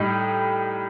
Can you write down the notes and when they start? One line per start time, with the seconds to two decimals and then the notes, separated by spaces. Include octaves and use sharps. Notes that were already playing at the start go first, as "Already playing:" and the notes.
Already playing: A2 G3 D#4